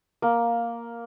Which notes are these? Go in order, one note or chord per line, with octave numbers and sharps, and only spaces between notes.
A#3